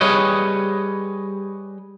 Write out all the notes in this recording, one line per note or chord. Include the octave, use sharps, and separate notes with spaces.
G3 G#4 B4 C#5 D#5